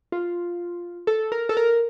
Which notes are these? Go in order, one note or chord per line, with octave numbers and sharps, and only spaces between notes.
F4
A4
A#4
A4
A#4